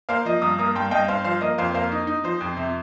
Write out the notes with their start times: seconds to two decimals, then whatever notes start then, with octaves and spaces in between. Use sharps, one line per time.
0.09 A#3 C5 F5
0.25 F3 D#5
0.42 G2 A#5 D#6
0.59 A#3 A#5 D#6
0.75 G2 G5 C6
0.91 G2 D#5 G5
1.08 G2 C5 F5
1.24 F3 C5 F5
1.41 A#3 D#5
1.58 F2 C5 F5
1.74 A#3 C5 F5
1.92 D#4
2.07 D#4
2.24 F3 C5
2.41 F2
2.57 C3